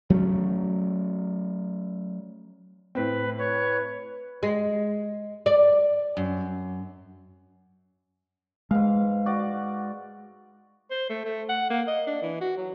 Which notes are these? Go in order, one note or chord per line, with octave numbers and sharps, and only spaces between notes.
F#3 A3 B3 C#4
A2 C4 B4
B4 C#5
G#3
D5
F#2
G#2 G#3 B4 F5
F#4 D5
C5
A3
A3
F#5
A#3
D#5
D4
E3
F#4
F#3